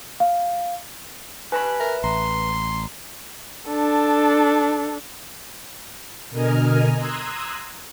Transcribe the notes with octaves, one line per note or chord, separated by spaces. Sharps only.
F5
B4 G#5 A5 B5
A#4 E5
A1 A#5 C6
D4 A4
B2 D3 A#4 D#5 G#5 F6
A#5 C6 D#6 E6 F#6 G#6